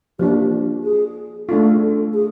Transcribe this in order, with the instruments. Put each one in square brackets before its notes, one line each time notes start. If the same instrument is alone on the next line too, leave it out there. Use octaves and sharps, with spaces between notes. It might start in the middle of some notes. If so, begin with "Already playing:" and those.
[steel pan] F3 A#3 D4 [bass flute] G4
[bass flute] G#4
[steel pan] A3 D4 F4 [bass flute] A4
[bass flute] G#4